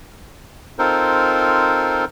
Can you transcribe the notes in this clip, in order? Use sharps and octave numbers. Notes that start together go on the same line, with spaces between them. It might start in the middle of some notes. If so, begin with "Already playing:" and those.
C4 D#4 F4 A4 A#4 C5